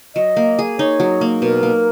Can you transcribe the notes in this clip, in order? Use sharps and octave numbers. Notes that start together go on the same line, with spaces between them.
F#3 D#5
A#3
G#4
D#4 C#5
F#3
A#3
B2 A#4
A#3